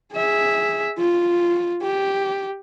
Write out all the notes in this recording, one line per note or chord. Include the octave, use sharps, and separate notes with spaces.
G#4 E5
F4
G4